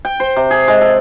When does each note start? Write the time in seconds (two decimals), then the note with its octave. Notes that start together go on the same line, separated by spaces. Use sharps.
0.05 G5
0.20 C5
0.36 C3
0.51 G#4
0.68 G#3
0.81 A4